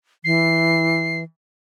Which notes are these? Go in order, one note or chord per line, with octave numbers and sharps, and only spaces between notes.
E3 C7